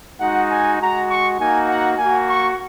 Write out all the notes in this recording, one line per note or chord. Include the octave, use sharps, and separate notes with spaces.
G#3 D#4 F#4 F#5
G#5
G#3 F#4 A#5
C#6
A#3 D#4 F#4 G#5
F#5
A#3 F#4 G#5
C#6